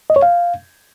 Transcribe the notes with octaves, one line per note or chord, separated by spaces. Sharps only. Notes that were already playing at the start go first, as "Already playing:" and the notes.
D#5
C#5
F5